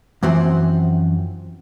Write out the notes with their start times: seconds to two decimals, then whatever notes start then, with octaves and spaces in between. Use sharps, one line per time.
0.23 F#2 E3 F3 C4 F#4 C5